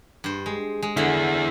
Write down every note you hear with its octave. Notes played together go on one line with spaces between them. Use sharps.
G2 C5
G#3
G#3
D3 E4 G#4 E5 F#5